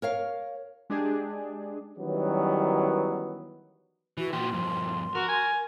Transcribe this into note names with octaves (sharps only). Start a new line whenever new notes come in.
A#4 C#5 F5
G#3 D4 G4 G#4
D#3 E3 F#3 G3 B3 C#4
E3 F#4
A#2 F#4 G5 C6
G2 F3
F#4 A#4
G#5